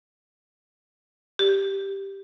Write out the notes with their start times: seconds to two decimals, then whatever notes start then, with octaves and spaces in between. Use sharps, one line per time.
1.39 G4